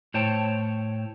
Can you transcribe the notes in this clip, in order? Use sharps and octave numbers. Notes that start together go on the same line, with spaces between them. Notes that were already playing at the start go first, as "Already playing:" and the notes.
A2 C5 C#5 G5 A5